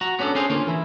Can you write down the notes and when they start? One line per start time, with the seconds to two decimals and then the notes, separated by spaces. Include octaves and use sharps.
0.01 F#4 A#5
0.19 B3 C#4 D4 G4 A4
0.35 C#4 D4 F4 G#4 C5
0.50 D3 A#3 C#4 F4
0.67 E3 E4